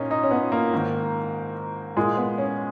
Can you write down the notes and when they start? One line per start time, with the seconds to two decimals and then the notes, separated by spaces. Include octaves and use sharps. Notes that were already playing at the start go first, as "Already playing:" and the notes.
Already playing: A#2 C#4 D#4
0.11 D#4
0.23 C#4
0.31 B3
0.52 A#3
0.73 G#2 D#3
1.97 A#2 G#3
2.17 B3
2.38 C#4